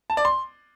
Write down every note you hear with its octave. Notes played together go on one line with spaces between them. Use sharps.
A5
D5
C6